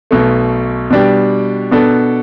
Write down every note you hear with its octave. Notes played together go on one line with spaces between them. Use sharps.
B1 B2 A3
B2 G3 D4 G4
B2 B3 D4 A4